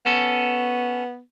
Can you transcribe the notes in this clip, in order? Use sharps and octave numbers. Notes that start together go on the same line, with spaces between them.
B3 C#4 A4